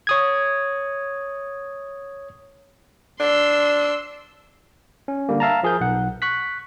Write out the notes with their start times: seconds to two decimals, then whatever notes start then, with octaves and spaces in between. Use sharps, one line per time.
0.07 C#5 D#6 G#6
3.20 D4 C6 E6
5.08 C#4
5.29 D3 G3 A#3
5.40 E5 F5 A5 A#5
5.63 F3 G#4 A#4 G6
5.81 B1 F#5
6.22 C#6 F#6 B6